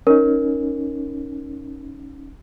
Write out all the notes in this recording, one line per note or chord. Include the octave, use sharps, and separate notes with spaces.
C#4 D#4 A#4